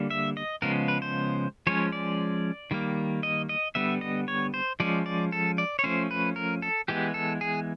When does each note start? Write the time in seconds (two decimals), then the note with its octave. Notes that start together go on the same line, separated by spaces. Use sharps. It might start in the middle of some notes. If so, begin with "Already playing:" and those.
Already playing: D3 G3 A#3
0.10 E5
0.37 D#5
0.62 C#3 F3 G#3 B3 A#4
0.88 B4
1.02 C5
1.67 F3 G#3 C#4 C#5
1.92 D5
2.71 D#3 G3 A#3
3.23 D#5
3.49 D#5
3.75 D3 G3 B3 E5
4.01 D#5
4.28 C#5
4.54 C5
4.80 F3 G#3 C#4 D5
5.06 D5
5.32 A4
5.58 D5
5.79 C#5
5.84 F3 A3 C#4 C5
6.11 B4
6.36 A#4
6.62 A4
6.88 E3 G#3 B3 G4
7.14 A4
7.41 G#4